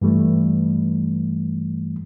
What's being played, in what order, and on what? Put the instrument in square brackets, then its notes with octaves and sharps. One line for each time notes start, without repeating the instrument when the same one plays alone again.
[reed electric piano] G2 E3 G3 A3